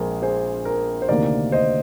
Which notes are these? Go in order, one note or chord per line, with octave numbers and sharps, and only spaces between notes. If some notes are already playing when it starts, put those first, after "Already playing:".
Already playing: A#1 A#2 G#3 G#4 A#4 C5
G#4 C5
A#4
C5
D2 C3 D#3 A#3 A#4 D5
C5 D#5